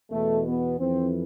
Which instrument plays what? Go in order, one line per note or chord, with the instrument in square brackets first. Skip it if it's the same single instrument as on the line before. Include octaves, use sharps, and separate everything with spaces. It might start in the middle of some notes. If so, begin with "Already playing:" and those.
[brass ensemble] E2 B2 A3
B3
F2 E3 C4